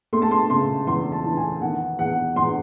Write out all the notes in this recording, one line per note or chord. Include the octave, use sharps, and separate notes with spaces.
A3 C6
A5
C6
C#3 C6
E2 C6
A5
E3
G#5
D#3 F#5
E2 F#5
E2 C6